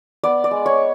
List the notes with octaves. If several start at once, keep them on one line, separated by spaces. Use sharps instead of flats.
B3 D5
D5
G#3
C#5